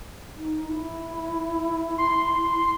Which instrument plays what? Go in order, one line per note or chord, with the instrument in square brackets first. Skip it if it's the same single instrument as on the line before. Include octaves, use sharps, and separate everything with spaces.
[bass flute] D#4
E4
[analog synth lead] C6